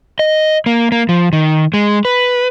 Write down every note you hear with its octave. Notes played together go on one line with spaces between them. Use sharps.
D#5
A#3
A#3
F3
D#3
G#3
B4